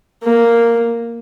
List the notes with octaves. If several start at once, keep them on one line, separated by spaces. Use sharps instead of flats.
A#3